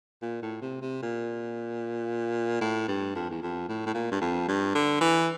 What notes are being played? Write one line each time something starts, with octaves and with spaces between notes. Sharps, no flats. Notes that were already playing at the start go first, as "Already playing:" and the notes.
A#2
A2
C3
C3
A#2
A2
G2
F2
E2
F2
A2
A2
A#2
G2
F2
G2
D3
E3